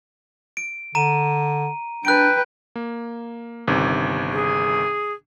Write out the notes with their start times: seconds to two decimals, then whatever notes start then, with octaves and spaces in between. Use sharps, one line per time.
0.57 D7
0.95 D3 A#5 D#7
2.05 D4 B4 G5 F#6 D7
2.76 A#3
3.68 G1 C3 D#3
4.33 G#4